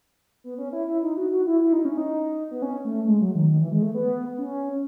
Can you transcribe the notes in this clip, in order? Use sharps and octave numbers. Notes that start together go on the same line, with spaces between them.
B3
C#4
E4
E4
D#4
F#4
F#4
E4
E4
D#4
C#4
D#4
B3
C#4
A3
G#3
F#3
D#3
D#3
E3
G#3
A3
B3
C#4